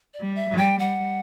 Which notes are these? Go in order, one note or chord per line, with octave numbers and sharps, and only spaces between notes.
D5
G3
E5
G3
G5
G3 F#5